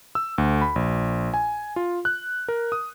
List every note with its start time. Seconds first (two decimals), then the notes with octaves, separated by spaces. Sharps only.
0.15 E6
0.38 D2
0.62 B5
0.76 A#1
1.34 G#5
1.76 F4
2.05 F#6
2.48 A#4
2.72 D#6